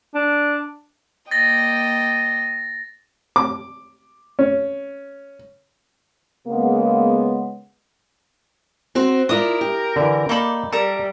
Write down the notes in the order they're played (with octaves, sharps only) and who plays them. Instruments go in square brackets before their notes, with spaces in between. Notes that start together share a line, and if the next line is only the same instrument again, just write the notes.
[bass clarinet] D4
[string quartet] A#3 D#5 G5 [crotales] A6 A#6
[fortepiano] D6
C#4
[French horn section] C#3 G#3 A#3 B3
[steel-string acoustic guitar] C4 F#4 C5
[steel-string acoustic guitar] D4 E4 F4 [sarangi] A#4 [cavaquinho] D#6
[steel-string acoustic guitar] G4
[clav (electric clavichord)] D3 E3
[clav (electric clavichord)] A#3 A4 [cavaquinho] D#4 D5 B5
[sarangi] G3 [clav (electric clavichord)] A4 [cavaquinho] A#4 E5